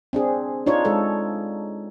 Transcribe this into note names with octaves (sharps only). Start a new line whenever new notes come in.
C4 D4 G#4
D4 D#4 F4 C#5
G#3 A4